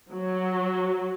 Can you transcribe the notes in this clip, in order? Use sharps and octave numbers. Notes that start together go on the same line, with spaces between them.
F#3